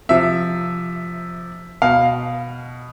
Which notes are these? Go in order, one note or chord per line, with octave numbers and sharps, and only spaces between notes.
C3 F3 E5
B2 F5